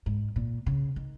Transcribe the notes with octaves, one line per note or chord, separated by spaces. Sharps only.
G#2
A#2
C#3
D#3